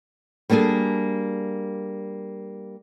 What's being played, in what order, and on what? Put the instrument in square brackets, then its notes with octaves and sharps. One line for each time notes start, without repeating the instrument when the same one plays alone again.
[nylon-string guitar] G3 A#3 D4 G#4 A4